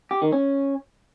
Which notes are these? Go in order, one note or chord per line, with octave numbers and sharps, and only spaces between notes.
G4
D#3
C#4